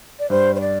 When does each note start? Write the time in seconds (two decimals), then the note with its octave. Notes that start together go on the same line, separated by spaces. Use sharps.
0.19 D5
0.30 G2 C5
0.55 C5
0.60 D5